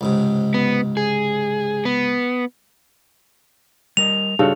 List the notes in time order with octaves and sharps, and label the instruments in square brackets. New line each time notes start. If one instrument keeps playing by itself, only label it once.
[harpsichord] C#2 G#2 C3
[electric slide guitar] B3
G#4
B3
[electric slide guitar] G3 A#4 D#5 [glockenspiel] F7
[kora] G2 C#3 A4 [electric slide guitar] D#4 F4 F#4